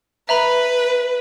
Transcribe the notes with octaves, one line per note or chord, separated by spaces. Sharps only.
B4 E5 A#5 B5